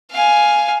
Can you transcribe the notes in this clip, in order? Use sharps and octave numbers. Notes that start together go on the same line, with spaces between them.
F5 G#5